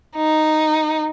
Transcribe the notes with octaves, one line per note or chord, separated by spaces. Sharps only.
D#4